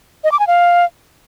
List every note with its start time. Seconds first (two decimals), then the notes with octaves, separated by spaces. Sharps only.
0.24 D#5
0.32 D6
0.39 G#5
0.47 F5